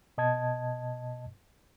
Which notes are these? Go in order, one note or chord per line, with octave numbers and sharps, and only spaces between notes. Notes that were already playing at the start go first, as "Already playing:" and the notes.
B2 D#5 A5 G#6